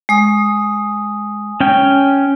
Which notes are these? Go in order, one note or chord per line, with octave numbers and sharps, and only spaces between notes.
G#3 D#6
C#4 G5